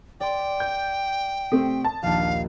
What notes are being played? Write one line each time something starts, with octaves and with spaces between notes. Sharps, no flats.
D5 G5 C6
G6
C3 A3 C4 D#6 B6 C7
A5
A#1 D#2 F5